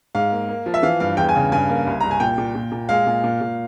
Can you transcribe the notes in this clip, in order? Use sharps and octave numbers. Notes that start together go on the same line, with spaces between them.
G#2 F5
A#3
A#3
F3
E5
E3 F5
G2 F5
E2 G5
G#5
C#3
G2 G#5
A#3
C2
C2 A#5
G#5
A#2 G5
A#2
A#2
A#2
G#3 F5
A#2
A#2
A#2